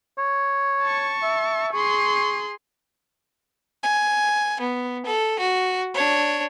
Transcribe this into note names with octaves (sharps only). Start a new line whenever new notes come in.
C#5
A5 C#6
E5
G#4 C6 C#6
G#5
B3
A4
F#4
D4 C#5